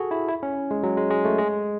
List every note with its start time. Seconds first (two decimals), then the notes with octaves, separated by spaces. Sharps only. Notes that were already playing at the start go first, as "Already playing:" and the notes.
Already playing: F#4 G#4 A4
0.11 E4
0.29 E4
0.43 C#4
0.71 G#3
0.83 F#3
0.97 G#3
1.11 G#3
1.25 A3
1.39 G#3